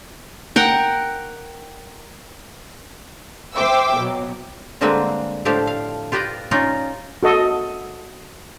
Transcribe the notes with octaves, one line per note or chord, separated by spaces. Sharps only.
A#4 F#5 G5
C5 E5 G5 D6 E6
B2 F#3
D3 G3 G#3 A#3 C4 B4
A2 F3 D4 G4 F5
F5
F4 G4 B4 D5 D#5
C#4 D#4 F4 D5
F#4 A4 D#5